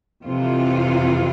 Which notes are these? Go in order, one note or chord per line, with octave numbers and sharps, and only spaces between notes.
F2 C3 E3 F4